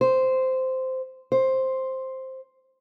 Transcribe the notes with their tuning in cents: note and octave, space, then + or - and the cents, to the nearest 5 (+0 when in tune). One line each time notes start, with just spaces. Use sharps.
C5 -10
C5 +5